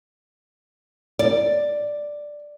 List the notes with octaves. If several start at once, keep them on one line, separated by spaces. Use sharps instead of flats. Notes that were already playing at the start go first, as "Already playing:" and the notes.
D5